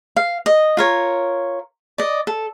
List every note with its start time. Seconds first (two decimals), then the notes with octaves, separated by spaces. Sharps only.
0.17 F5
0.46 D#5
0.77 F4 A#4 C#5
1.98 D5 D#5
2.27 A4